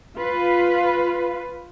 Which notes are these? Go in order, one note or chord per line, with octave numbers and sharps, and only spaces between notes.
F4 B4